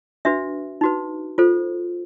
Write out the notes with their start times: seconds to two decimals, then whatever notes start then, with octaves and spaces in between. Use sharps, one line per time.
0.25 D4 F#4 B4 E5
0.81 D#4 F#4 B4
1.38 F4 A4 C5